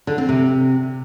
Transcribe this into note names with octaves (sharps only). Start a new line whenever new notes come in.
D3
C4
C3